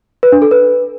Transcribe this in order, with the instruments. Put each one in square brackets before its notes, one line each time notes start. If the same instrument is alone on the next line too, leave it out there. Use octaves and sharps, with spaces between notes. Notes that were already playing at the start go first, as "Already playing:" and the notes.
[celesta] B4
D4
A4
B4